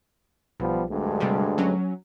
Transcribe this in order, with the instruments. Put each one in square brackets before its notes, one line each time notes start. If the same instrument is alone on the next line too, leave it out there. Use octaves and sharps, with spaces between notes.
[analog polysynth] B1 [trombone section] F3 G3 B3
[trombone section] D2 G2 G#3
[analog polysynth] C3 G3
F#3 C#4